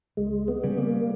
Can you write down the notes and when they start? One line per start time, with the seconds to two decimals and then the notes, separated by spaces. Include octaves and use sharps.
0.17 C#2 G#3
0.48 B3
0.64 C#3 G3
0.78 A#3